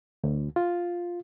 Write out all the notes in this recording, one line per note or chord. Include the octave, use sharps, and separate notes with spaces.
D2
F4